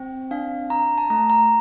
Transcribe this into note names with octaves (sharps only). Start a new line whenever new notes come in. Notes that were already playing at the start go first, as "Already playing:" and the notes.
Already playing: C4 G5
D4 F5
D4 A#5
A5
A3 A#5
A#5